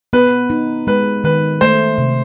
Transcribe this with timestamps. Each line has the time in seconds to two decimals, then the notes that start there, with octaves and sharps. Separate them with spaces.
0.13 B3 B4
0.50 D#4
0.87 G#3 B4
1.24 D#3 B4
1.61 A3 C5
1.98 C3